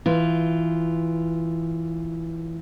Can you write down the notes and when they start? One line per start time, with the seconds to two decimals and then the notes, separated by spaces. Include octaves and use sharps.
0.06 E3 F4